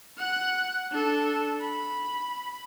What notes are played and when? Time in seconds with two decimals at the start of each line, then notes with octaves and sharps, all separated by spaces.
0.17 F#5 F#6
0.91 D4 A4
1.60 B5